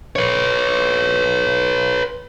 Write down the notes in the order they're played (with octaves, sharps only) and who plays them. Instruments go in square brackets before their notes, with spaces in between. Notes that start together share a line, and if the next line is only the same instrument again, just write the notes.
[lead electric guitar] B4 C#5